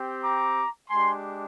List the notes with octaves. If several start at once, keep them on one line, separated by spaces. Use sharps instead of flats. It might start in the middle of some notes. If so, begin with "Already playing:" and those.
Already playing: C4 G4
A#5 D6
G#3 D4 G4 G#5 C6